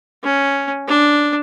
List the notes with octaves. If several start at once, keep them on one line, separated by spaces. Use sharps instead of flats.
C#4
D4